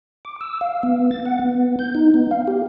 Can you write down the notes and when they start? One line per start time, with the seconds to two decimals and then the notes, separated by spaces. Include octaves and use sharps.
0.25 D6
0.41 E6
0.61 F5
0.83 B3
1.11 A6
1.26 F#5
1.39 B3
1.79 G6
1.95 D#4
2.14 B3
2.31 F5
2.48 G4